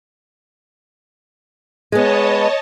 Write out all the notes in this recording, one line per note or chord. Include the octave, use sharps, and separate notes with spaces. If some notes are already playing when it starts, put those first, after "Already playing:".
G#3 B3 C#5 D#5 A5